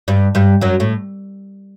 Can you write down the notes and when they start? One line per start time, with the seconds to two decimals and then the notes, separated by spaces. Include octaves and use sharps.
0.08 G2 G3
0.35 G2 G3
0.61 F#2 F#3
0.80 A2